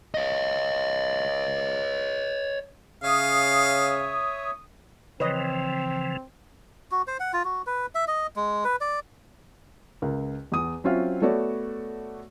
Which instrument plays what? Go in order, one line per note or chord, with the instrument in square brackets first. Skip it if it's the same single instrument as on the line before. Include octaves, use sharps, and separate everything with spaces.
[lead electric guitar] C#5 D#5
[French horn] C#3 [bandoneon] C#5 E5 [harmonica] F5 [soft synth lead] D#6
[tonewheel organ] C#3 E3 F3 [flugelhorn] C4 [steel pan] B4 C#5 D#5
[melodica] F#4
C5
F#5
F4
F#4
B4
E5
D#5
G#3
B4
D5
[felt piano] C#2 A#4
E2 D#6
F#3 C4 C#4 F4 E5 F5
A3 B3 F#4 A4 C#5 D5